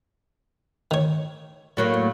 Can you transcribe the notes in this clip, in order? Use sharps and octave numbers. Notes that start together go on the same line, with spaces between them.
D#3 C#5
A2 F#3 A#3